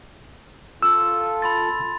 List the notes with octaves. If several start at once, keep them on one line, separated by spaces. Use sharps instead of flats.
F4 A4 E6
B5 C6 A6